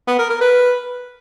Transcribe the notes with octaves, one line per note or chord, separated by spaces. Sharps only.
B3
A#4
A#4
B4